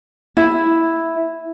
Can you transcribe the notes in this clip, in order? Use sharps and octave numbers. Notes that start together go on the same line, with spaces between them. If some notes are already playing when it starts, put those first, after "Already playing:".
E4